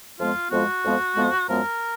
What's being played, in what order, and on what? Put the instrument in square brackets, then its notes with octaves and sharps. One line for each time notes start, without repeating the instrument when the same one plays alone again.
[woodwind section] F2 F3 G#3 B3 F4
F2 F3 G#3 B3 F#4
F2 F3 G#3 B3
F2 F3 G#3 B3
F#2 F3 G#3 B3 A#4